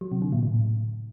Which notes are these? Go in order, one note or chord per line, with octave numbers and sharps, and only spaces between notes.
F#3
C3
D3
A#2
A2